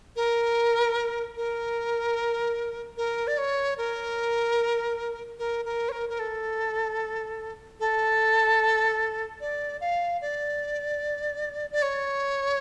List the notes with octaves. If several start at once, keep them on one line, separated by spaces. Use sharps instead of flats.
A#4
A#4
A#4
D5
C#5
A#4
A#4
A#4
C#5
A#4
A#4
A4
A4
D5
F5
D5
D5
C#5